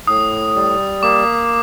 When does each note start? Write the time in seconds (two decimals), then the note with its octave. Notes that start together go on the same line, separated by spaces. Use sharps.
0.07 A2 D#6
0.55 G3
1.03 A#3 D6